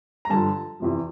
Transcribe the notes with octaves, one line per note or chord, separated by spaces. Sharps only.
A#5
G2 D3 F3 A5
E2 C3 F3